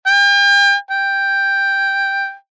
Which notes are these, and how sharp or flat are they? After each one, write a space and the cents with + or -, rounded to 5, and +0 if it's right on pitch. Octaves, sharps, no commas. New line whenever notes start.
G5 +40
G5 +5